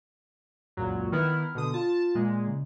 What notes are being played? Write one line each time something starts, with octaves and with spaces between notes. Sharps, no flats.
C#2 F#2 A#2 F#3
D#3 B3 E4 F6
B2 D3 D#6
F4 A5
A#2 G#3
C#3